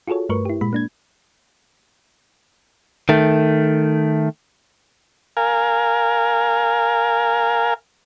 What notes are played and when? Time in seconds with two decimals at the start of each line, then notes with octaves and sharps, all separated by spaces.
0.08 F4 F#4 G#4 A4 C#5
0.29 G2 A3 A#4 B4 C#6
0.45 E4 G4
0.61 A#2 G#3 B5
0.73 A#3 D4 G#6
3.09 D#3 A3
5.37 A#4 F5 G#5